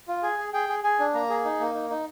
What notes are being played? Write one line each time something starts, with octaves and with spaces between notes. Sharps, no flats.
F4
G#4 G#5
G#4
G#4 G5
G#4
G#4 G#5
D4
A#3 A#5
G#4
D#4
A#3
D#4
D#4